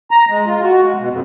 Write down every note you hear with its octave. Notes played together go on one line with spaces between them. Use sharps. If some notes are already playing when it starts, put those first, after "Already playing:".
A#5
G#3
F4
F#4
G#3
B2
F2